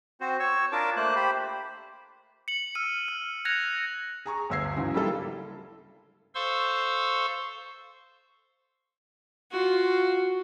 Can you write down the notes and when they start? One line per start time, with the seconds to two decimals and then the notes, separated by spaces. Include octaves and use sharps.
0.21 C4 F#4 C5
0.40 C#5 C#6 E6
0.72 D4 F4 A#4 A5 D6
0.97 A3 A#3 C5 F#6
1.16 G4 C5 B5
2.48 C#7 F#7
2.75 E6 F6 D#7
3.08 F6
3.45 F#6 G#6 A#6 C#7 F7
4.26 G#4 A#5 C#6
4.50 G1 D2 E6 G#6 C7
4.76 G#2 C#3 E3 F#3
4.94 G3 A#3 E4 F4 A4
6.35 A4 C5 F5 C6 C#6 E6
9.52 F4 F#4